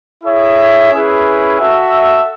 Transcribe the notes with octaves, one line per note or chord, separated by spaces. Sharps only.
E4 G#4 C#5 E5
C#4 E4 G#4 B4
F#4 A4 E5